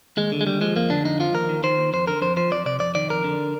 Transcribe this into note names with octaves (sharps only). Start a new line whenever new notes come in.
D#2 G#3
D3
G#3
D#2 G3
F3 G#3
F2 A#3
D3 D4
F2 D#4
F3 F4
D#2 A#4
D#3
D#3 C5
D#2
F2 C5
D3 A#4
F2 C5
F3 C5
F2 D5
C3 D5
F2 D5
D#3 D5
F2 A#4
D3